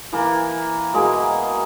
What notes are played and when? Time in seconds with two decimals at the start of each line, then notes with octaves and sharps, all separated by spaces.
0.12 E3 A#3
0.93 B2 G#3 A#3